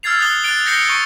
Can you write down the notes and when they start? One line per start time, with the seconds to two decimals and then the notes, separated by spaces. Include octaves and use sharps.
0.03 E6 F6 G#6 A6 C7 F7
0.19 D#6 F#6 A6 G7
0.44 F#6 A6 D7 F7
0.66 G6 A#6 C7 C#7 F7 G7
0.89 C#6 D7